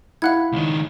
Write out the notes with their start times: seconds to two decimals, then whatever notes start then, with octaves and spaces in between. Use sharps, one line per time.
0.22 E4 F5 F#5 F#6 G#6
0.52 C#2 D#3